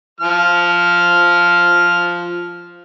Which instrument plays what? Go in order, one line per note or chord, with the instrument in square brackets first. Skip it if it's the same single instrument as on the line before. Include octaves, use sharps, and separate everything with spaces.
[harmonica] F3 F6